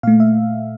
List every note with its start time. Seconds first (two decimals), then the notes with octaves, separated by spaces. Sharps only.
0.03 A#2 A3 F5
0.20 E5